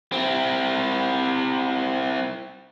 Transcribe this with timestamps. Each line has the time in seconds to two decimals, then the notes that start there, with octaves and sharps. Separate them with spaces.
0.12 C4 E4